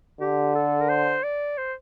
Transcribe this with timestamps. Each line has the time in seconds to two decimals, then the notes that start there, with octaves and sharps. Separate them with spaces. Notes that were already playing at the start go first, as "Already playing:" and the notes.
0.20 D3 G4
0.55 A4
0.81 A#4
0.89 C5
1.23 D5
1.58 C5